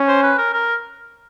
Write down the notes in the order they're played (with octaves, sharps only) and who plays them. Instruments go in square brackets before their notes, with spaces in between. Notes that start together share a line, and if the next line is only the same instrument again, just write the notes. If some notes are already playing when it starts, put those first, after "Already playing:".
Already playing: [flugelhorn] C#4
[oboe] C5
B4
A#4
A#4